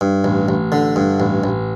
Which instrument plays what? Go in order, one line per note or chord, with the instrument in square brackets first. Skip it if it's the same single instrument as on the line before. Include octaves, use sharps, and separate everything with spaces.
[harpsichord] G2
A1
A1
D3
G2
A1
A1